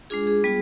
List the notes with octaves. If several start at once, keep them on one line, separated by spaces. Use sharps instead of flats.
G#3 D4 F4 G#4
G#4
G3 B3 F4